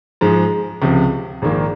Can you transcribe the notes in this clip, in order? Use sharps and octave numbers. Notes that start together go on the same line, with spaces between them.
G#2 F3 G#3
C#2 C3 F3
A#1 G#2 D#3 A#3